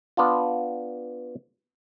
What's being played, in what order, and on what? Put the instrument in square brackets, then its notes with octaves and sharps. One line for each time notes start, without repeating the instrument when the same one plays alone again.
[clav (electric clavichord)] B3 D4 F4